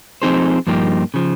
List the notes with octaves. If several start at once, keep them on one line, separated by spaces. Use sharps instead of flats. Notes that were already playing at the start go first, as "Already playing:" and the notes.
F3 C4 D#4 G#4 C5
G2 F3 A#3 D#4 G4
C#3 F3